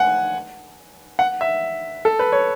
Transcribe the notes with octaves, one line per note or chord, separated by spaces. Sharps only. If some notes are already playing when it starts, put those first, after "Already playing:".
Already playing: F#5 G#5
F#5
E5
A4
B4
C#5